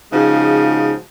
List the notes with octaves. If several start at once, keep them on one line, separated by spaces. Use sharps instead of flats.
C#3 F3 G#3 D#4 F#4